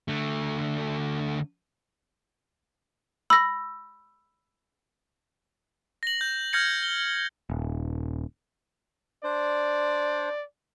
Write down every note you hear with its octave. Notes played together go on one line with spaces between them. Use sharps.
D3 A3
B5 E6 A#6
A#6 F#7
G6
F6 G6 G#6 A#6 C#7 F#7
G7
D#1
D4 C5 D5